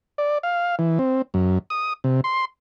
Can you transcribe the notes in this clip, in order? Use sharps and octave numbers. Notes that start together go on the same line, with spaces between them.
D5
F5
E3
C4
F#2
D#6
C3
C6